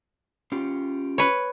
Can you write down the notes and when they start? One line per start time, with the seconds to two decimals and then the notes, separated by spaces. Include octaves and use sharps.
0.52 C#4 F4 G4
1.18 B4 C#5